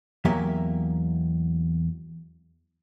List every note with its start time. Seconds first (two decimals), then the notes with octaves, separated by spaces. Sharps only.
0.25 E2 F#3 A#3 G4 E5 G#5